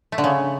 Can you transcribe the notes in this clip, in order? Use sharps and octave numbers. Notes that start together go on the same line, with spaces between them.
A3
D3
C#3